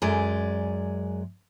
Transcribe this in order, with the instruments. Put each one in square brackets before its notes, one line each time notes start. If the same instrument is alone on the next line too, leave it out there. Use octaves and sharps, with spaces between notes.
[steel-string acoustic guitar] F#2 G#3 D5